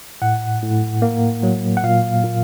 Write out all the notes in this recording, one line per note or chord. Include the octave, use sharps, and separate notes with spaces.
A2 F#5
A2
A#3
F#3
F#5
A#2 F5
A#2